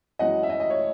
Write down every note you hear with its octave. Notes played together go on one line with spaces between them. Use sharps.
F#2 E3 G#3 D#5 F#5
E5
D#5
D#5
C#5